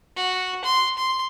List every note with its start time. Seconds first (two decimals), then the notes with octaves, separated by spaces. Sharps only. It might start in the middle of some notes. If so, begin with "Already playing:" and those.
0.16 F#4
0.65 C6
0.98 C6